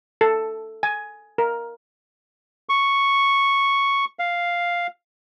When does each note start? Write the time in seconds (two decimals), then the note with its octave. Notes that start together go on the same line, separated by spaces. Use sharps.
0.21 A4
0.83 G#5
1.38 A#4
2.69 C#6
4.19 F5